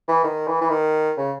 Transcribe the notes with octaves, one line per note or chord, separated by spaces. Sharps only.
E3
D#3
E3
E3
D#3
C#3